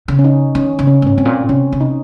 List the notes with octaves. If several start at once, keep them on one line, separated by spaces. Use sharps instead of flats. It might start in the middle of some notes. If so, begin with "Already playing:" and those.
C#3
C#4
D#4
D#3 C#4
C#3
C#4
G#2 C#4
G#2 C4
A#2
C3 C#4
C3
D#4